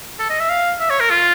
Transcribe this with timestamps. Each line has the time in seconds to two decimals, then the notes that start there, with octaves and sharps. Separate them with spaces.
0.19 A4
0.30 D#5
0.40 E5
0.50 F5
0.80 E5
0.90 C#5
1.00 A#4
1.10 F4